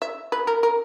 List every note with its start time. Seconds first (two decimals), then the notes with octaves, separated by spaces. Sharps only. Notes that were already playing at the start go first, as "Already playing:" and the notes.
0.02 E5
0.32 B4
0.47 A#4
0.63 A#4